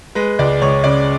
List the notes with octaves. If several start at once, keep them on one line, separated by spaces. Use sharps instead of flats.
G#3 B4
C#2 D5
C#2 C#5
C#3 D5